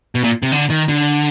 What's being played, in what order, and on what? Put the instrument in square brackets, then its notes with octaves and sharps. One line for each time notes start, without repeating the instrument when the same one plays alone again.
[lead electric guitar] B2
A#2
C3
D3
D#3
D3